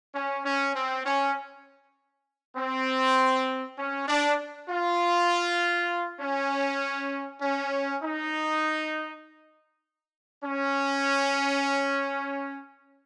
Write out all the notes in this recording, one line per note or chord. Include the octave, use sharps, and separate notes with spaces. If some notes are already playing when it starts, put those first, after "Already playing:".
C#4
C#4
C4
C#4
C4
C#4
D4
F4
C#4
C#4
D#4
C#4